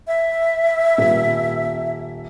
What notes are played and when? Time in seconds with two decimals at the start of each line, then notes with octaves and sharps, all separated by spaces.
0.07 E5
0.98 D#1